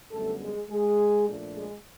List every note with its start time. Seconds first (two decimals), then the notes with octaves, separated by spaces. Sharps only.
0.12 F#2 D3 G3 A3 B3 A4
0.41 G#3 G#4
0.70 G#3 G#4
1.26 A#2 F3 A3 D4
1.55 G#3 G#4